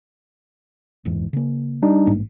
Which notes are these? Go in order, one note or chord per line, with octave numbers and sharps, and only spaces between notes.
F#1 E2 G#2
C#3 A#3
G3 D4 D#4
A1 G#2 A#3